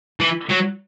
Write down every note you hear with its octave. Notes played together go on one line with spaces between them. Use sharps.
E3
F#3